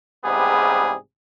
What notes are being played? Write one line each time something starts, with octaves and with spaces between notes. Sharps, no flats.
A1 G#2 C3 G3 B3 G#4